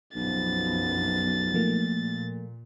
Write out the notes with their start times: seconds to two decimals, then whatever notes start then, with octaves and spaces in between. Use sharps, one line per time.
0.16 B1 F#2 F3 B3 A6
1.53 A#2 F3 A3 A#3